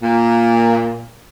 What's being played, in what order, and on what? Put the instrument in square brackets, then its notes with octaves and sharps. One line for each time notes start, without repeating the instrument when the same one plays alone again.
[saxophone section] A#2